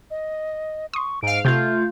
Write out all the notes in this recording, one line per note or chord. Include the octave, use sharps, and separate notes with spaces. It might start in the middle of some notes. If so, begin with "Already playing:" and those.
D#5
C6 C#6 D#6
G#2 F5 D7
C3 A3 F4 F#5 G6 G#6